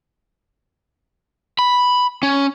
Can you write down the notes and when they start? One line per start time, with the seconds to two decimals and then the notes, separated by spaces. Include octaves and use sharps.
1.59 B5
2.23 C#4